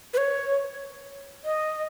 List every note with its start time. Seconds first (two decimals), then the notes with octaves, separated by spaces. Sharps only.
0.14 B4
0.17 C#5
1.45 D#5